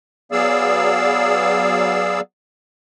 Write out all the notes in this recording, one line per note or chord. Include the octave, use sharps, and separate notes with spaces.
F#3 B3 G#4 D5 F5 E6